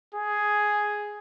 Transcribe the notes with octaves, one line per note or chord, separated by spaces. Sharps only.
G#4